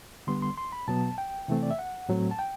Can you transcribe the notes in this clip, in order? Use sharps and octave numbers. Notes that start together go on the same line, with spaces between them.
D3 G3 B3 C6
C6
C6
B5
B2 F#3 B3 A5
G5
C3 E3 A3 C4
D5
E5
F#5
A2 F#3 A3 C4
A5
G5